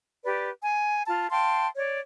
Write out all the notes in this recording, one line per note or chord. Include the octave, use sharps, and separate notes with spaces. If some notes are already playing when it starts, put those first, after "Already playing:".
G4 B4 D5
G#5
F4 A5
F5 G5 A5 C6
C#5 D5